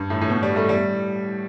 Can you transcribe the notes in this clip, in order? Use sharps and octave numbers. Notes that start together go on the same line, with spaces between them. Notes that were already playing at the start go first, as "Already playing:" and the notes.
Already playing: G2
A2
A2
B2
G3
A3
G3